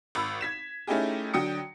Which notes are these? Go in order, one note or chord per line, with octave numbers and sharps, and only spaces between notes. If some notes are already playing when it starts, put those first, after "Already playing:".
G#1 B5 E6
G#6 B6 E7
A3 C#4 D#4 E4 G4 G#4
D3 F#3 G5 D#6 C#7